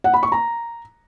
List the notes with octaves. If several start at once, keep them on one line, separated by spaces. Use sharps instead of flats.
F#5
B5
C#6
A#5